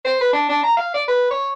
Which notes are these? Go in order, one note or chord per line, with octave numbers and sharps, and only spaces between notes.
C5
B4
D4
D4
A#5
F5
D5
B4
C#5